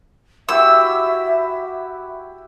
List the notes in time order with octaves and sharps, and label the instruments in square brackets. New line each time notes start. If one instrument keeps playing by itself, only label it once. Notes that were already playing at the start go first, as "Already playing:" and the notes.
[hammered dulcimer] E4 F#4 G4 [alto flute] E5 [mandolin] E6